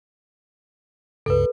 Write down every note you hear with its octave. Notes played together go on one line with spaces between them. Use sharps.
C#2 G2 C#3 A4 B4